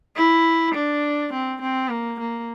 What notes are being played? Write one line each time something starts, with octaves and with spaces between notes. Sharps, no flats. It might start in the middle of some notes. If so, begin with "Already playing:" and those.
E4
D4
C4
C4
A#3
A#3